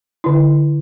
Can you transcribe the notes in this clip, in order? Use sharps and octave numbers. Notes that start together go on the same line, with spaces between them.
D3 E4